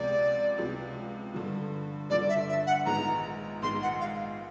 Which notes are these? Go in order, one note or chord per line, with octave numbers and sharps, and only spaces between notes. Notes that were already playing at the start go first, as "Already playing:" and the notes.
Already playing: C#2 C3 F3 G#3 B3 D5
C#2 C3 F3 G#3 B3
G2 D3 F3
G2 D3 F3 D5
E5
E5
F#5
A#1 G#2 D#3 G#3 B3 A#5
A#1 G#2 D#3 G#3 B3 C6
F#5
F5